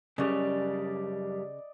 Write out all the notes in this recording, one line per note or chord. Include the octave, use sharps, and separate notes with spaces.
F#2 C#3 G3 D5 D#5